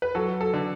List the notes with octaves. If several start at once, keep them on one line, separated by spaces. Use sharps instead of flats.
B4
F#3 A4
A4
D3